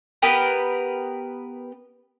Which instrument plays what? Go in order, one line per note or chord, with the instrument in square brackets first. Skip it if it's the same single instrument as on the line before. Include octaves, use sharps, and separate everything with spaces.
[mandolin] B3 G4 A#4 B4